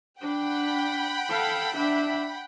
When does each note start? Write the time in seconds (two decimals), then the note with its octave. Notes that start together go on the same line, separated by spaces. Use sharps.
0.21 D4 F#5 G5 B5
1.29 A4 F5
1.75 D4 E5